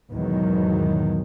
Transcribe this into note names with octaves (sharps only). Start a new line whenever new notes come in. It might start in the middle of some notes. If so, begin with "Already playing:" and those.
E2 G#2 B2 D#3 F#3